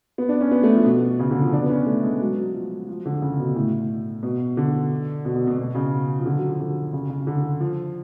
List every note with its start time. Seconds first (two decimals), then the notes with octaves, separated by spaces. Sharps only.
0.18 B3
0.29 D4
0.41 C#4
0.51 B3
0.63 A3
0.74 F3
0.85 B2
1.19 C#3
1.31 D3
1.41 F3
1.53 D4
1.63 B3
1.70 C#4
1.87 A3
2.03 G#3
2.21 F#3
2.38 F#3
2.54 F3
2.88 F3
3.06 D3
3.22 C#3
3.39 B2
3.56 A2
4.23 B2
4.57 D3
5.25 B2
5.36 B2
5.47 B2
5.58 B2
5.75 C#3
6.19 F3
6.26 D3
6.37 F#3
6.48 F3
6.60 D3
6.93 C#3
7.10 C#3
7.27 D3
7.60 F3